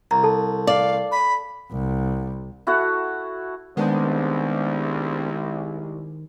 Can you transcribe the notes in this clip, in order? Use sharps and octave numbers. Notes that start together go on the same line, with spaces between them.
C2 A#5
A4 A5
D5 F5
B5
C2
E4 F#4 A4 F#5
C2 D#3 G#3 B3 D4 C5